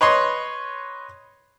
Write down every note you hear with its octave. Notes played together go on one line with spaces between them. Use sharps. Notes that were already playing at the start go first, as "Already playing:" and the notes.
B4 C#5 D#5 C6